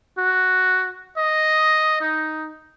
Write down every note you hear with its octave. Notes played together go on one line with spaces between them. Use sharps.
F#4
D#5
D#4